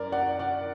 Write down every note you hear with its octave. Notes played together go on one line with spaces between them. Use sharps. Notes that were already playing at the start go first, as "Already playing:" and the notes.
Already playing: F#2 A#4 D5
D5 F#5
D5 F#5